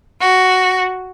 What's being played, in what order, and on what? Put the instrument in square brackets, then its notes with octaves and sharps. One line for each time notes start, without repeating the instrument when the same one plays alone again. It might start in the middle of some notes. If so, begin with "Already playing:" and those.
[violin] F#4